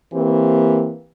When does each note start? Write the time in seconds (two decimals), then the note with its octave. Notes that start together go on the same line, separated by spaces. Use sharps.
0.12 E3 A#3 C4 G4